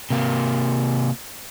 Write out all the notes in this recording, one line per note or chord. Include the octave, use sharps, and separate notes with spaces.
C3 A#3